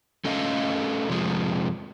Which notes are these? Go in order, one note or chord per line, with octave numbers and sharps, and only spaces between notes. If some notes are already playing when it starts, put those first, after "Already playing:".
A3 C#4 A4 D#5 F5
F2 C3 F3 G#3